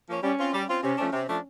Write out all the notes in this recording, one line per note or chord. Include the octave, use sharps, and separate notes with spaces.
F3 A#3 C#4
G3 C#4
C4 F4
G3
C4 F4
C3 C#4
F3 A3 D4
C3
F3 A3 D4